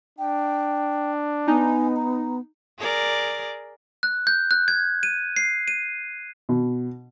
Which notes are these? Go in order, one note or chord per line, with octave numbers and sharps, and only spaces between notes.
D4 G5
B3 D#4 G#5
A#5
G#4 A#4 D5
F#6
G6
F#6
G#6
D#7
C7
D#7
B2